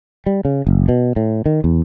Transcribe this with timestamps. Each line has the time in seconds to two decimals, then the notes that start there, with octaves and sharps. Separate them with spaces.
0.26 G3
0.45 C#3
0.67 F#1
0.89 B2
1.16 A2
1.46 D#3
1.64 E2